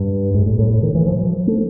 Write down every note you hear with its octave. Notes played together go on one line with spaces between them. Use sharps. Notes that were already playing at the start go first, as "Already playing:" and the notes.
Already playing: G2
G#2
A2
A2
A2
D#3
E3
F3
F#3
A3